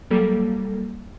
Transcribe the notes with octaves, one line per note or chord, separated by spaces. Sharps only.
F#3 G3 A#3 A4